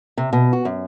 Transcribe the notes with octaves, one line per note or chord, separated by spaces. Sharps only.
C3
B2
F#4
F#2